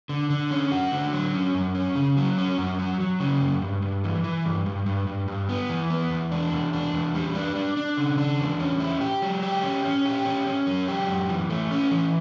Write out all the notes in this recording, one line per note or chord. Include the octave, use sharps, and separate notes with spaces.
D3
D3
C#4
F#4
D3
F#3
C#4
F#2
C#4
C#3
F#3
C#4
F#2
F#3
F#3
C#3
F#2
G2
G2
E3
E3
G2
G2
G2
G2
G2
B3
E3
B3
E2
D4
E2
D4
E2
G3
D4
D4
D4
C#3
D4
E2
C#4
E4
G4
F#3
G4
C#4
C#4
G4
C#4
C#4
F#3
G4
F#2
E3
A3
C#4
E3